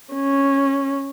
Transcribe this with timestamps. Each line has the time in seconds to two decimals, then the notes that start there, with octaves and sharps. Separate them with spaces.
0.14 C#4